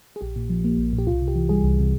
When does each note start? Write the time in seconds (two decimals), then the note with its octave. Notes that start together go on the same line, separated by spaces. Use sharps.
0.16 G#4
0.21 A#1 G4
0.36 A#2
0.50 F3
0.64 A#3
0.79 A#1
0.93 A#2
0.98 G4
1.07 C2 F4
1.22 C3
1.28 G4
1.36 E3
1.49 G3 G#4
1.64 C2
1.79 C3